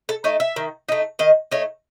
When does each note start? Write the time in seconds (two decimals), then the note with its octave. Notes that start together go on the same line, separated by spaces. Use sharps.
0.09 A4
0.24 A3 D#4 C#5
0.40 E5
0.56 D#3
0.89 A3 D#4
1.19 D#3 D#5
1.51 A3 D#4 C#5